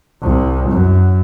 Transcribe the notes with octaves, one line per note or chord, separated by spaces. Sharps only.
C2
F#2